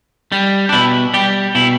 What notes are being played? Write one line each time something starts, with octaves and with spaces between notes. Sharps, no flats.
G3
D4
B2 E4
G3 G4
B2 E4